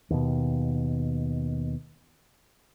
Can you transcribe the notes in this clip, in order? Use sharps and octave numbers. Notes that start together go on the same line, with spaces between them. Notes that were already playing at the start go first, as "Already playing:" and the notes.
D#2 B2